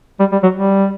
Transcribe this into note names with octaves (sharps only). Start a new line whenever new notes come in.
G3
G3
F#3
G3